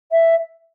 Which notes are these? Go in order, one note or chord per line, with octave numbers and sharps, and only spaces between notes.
E5